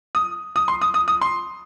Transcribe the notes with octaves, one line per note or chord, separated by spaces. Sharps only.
D#6
D#6
C6
D#6
D#6
D#6
C6